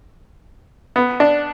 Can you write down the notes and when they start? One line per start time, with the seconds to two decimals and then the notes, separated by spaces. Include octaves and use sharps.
0.96 B3
1.20 D4